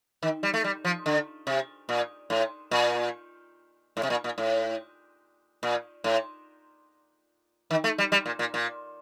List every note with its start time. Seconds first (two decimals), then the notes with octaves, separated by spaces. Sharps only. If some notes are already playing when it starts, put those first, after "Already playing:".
0.23 D#3
0.43 G3
0.54 A3
0.64 G3
0.85 F3
1.06 D3
1.47 C3
1.89 A#2
2.30 A2
2.71 A#2
3.97 A2
4.03 C3
4.10 A#2
4.24 A#2
4.38 A2
5.63 A#2
6.04 A2
7.71 D#3
7.84 A3
7.98 G3
8.12 G3
8.26 A#2
8.39 A#2
8.54 A#2